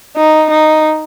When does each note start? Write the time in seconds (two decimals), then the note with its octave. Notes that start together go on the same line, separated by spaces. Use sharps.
0.17 D#4
0.50 D#4